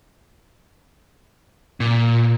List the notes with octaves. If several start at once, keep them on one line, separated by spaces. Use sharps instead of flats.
A#2